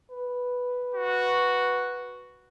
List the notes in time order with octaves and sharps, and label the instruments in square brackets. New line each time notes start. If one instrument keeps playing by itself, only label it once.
[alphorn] B4
[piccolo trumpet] F#4